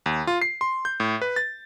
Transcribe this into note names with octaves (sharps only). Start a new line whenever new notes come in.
D#2
F4
C7
C6
G6
A2
B4
A6